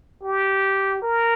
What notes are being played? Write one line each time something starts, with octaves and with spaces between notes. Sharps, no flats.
G4
A#4